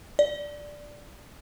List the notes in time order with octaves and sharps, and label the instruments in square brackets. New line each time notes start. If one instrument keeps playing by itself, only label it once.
[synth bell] D5